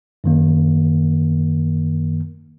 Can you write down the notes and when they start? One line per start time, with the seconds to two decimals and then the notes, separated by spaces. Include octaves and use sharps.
0.24 F#2 D#3 A#3